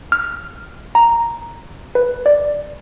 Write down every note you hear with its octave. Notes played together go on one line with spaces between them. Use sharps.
F6
A#5
B4
D5